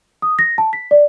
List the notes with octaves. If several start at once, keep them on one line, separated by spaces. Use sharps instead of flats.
D#6
A#6
A5
B6
D5